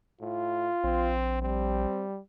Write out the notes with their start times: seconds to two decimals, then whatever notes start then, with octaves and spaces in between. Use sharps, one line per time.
0.21 A2 F4
0.84 A#1 C4
1.42 G3 C4